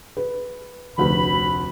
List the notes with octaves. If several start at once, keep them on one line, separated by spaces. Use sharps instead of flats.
B4
F1 D2 B4 B5